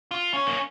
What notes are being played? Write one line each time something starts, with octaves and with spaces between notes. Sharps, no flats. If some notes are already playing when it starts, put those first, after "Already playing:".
F4
C#4
A#3